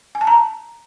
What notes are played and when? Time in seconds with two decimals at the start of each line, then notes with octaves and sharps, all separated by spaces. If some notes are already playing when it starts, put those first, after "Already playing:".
0.15 G#5
0.21 A5
0.27 A#5